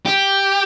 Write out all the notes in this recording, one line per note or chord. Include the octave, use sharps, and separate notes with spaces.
G4